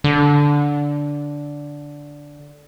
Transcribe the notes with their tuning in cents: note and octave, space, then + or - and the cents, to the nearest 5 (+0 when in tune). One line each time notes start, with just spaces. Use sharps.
D3 -10